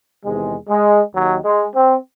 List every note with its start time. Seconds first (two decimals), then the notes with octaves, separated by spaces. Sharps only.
0.24 E2 C3 D#3 G#3
0.69 G#3
1.14 D#2 D#3 F#3
1.45 G#3
1.75 C4